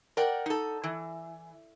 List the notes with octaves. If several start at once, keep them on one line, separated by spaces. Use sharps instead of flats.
A#4 D5 F#5 G5
D#4 A4
E3